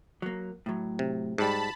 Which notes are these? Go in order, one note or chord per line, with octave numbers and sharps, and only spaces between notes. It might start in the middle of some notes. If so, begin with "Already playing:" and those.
F#3 A#3
A2 F#3
C3
G#2 G3 A5 B5